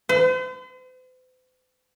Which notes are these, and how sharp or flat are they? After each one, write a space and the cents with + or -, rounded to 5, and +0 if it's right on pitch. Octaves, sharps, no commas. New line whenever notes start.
C5 -45